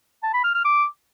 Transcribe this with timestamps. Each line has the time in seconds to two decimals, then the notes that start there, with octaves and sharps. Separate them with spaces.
0.23 A5
0.34 B5
0.44 F6
0.54 F6
0.65 D6